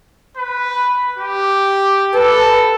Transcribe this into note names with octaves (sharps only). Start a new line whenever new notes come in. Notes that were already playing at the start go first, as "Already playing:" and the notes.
B4
G4
A4 B4